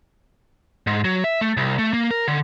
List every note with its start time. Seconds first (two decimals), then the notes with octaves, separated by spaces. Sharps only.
0.87 G#2
1.05 F#3
1.24 E5
1.41 A3
1.57 C2
1.79 A3
1.93 A#3
2.11 A#4
2.28 D3